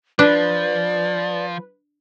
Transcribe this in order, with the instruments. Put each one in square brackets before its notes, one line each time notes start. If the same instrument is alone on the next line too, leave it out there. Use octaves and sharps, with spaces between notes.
[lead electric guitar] F3 [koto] D4 [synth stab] B4 [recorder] D5